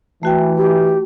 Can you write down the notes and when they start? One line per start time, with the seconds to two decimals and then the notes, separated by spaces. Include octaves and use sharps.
0.23 E3 A3 F#4 G5
0.57 G4